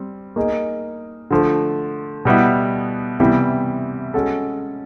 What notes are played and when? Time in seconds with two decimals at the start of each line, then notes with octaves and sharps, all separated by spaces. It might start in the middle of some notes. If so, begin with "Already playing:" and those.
Already playing: G3 C4
0.36 A#3 D#4 G#4
1.31 D3 F3 A3
2.25 B2 G3 B3 E4
3.20 C3 E3 G3 B3 E4
4.14 G#3 C#4 F#4 A4